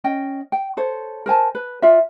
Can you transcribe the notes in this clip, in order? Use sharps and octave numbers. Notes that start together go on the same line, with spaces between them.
C#4 D#5 G5
G5
A4 C5 C#5
A#4 C5 G#5 A5
B4
F4 D5 E5